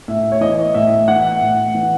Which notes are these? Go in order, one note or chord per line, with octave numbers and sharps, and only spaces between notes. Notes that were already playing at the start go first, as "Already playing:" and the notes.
A2 E5
C#5
E3 D#5
A2 E5
E3 F#5
A2
E3